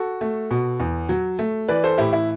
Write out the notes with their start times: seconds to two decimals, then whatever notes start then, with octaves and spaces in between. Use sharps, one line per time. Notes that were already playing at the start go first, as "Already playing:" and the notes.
Already playing: F#4 A4
0.21 A3
0.51 B2
0.80 E2
1.09 F#3
1.39 A3
1.68 E3 B4 D5
1.84 A4 C5
1.98 A2 E4 G4
2.13 E4